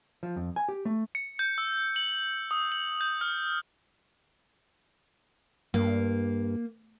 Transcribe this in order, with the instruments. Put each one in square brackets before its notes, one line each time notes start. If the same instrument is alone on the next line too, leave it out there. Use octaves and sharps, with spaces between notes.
[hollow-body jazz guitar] F3
F2
G#5
G4
A3
[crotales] C#7
G6
E6
F#7
D#6
F#7
G6
F6
[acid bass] G2 [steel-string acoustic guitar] A#3